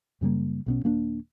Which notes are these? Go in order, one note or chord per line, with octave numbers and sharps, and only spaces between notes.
F#2 C#3 G3 A#3
B1 B2 C#4
D#1 A#3 C#4 D4